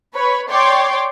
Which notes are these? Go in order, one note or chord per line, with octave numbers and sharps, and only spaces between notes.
B4 C#5 B5
C#5 D5 G5 C6 D6